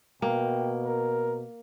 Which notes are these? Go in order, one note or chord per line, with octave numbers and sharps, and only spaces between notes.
B2 A#3 G5
A#4